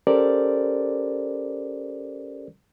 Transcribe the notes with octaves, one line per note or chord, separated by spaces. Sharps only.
C#4 G4 A4 A#4 C5 D5